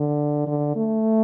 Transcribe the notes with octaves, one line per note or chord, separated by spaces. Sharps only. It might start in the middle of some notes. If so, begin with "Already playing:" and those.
Already playing: D3
D3
A3